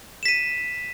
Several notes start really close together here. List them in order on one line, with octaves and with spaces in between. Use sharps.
E7 B6 D#7